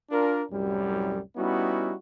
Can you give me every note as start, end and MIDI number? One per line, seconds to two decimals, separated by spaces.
0.11 0.43 62
0.11 0.43 65
0.11 0.43 70
0.51 1.20 36
0.51 1.20 42
0.51 1.20 45
0.51 1.20 54
0.51 1.20 55
1.37 1.94 55
1.37 1.94 59
1.37 1.94 61
1.37 1.94 63
1.37 1.94 64
1.37 1.94 66